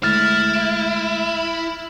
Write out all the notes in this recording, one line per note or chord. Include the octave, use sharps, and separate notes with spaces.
D2 G#3 A3 E4 F6 A6